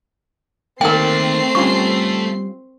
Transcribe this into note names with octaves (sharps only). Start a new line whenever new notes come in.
D#3 A3 A#3 C4 A#4 D5 G5 C7
G3 C#4 F4 C#6